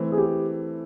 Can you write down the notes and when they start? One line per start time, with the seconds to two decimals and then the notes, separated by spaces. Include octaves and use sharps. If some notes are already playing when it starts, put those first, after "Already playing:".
Already playing: E3 A3 C4
0.12 G#4
0.18 G4